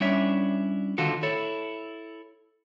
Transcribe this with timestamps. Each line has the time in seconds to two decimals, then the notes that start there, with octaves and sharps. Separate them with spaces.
0.01 G3 C#4 D4 E4 C#5 E5
0.98 D3 D#3 F4 F#4 A4
1.23 E4 A4 C#5